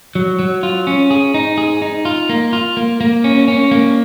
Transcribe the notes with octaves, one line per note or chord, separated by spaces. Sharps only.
F#3
F#3
F4
C#4
G#4
D#4
G#4
D#4
F4
A#3
F4
A#3
A#3
C#4
C#4
A#3